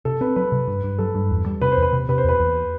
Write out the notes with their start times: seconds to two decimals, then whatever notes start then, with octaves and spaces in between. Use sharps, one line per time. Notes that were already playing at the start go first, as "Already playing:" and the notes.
0.05 C3 A4
0.21 C4 B4
0.36 F#3 B4
0.52 C3
0.68 G2
0.84 G2
0.98 F#3 A4
1.15 G2
1.31 E2
1.46 G3
1.61 C3 B4
1.72 C5
1.77 E2
1.82 B4
1.93 C3
2.09 C3 B4
2.18 C5
2.24 E2 B4
2.40 E2